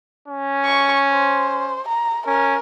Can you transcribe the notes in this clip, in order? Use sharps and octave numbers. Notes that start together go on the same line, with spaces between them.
C#4
C#6
C5
A#5
C#4 A#4